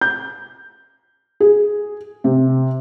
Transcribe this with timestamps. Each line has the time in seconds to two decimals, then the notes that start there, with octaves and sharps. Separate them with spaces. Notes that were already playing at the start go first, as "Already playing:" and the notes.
0.01 G6
1.40 G#4
2.24 C3